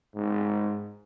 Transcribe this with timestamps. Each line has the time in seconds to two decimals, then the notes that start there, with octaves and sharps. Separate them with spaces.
0.15 G#2